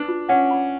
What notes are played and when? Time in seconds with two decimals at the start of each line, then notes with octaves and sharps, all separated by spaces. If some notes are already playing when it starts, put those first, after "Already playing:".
Already playing: D4 B4
0.08 F4
0.29 C#4 F#5
0.51 B5